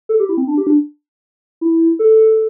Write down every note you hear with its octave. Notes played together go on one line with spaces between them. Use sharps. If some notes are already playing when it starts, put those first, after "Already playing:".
A4
G4
E4
C4
D4
G4
D4
E4
A4